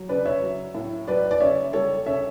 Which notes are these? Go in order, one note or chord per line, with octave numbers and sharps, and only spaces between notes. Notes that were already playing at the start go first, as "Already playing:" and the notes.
Already playing: F#3
C#3 B4 D5
C#5 E5
F#3
A2
F#3 B4 D5
D5
C#3 C#5 E5
G3 A4 C#5
C#3 C#5 E5